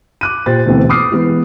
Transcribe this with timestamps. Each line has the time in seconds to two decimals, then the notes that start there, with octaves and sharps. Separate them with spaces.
0.21 D6 F#6 D#7
0.46 A#2 G4 C5 A6
0.66 D2 B2 E3 A3 B3 C4
0.89 D6 D#6 F6 C7
1.12 E3 G#3 B3